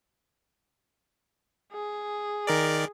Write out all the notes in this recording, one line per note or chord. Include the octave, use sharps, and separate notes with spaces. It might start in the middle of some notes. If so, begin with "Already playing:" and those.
G#4
D#3 A#4 D5